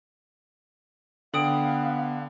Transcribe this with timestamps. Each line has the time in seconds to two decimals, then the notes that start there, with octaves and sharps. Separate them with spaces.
1.34 D3 B3 F5 G5 D#6 F#7